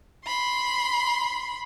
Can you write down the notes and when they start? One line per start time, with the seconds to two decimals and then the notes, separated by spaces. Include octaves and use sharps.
0.25 B5 C6